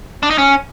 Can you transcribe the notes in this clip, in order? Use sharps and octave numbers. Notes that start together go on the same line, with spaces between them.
D4
D#4
C#4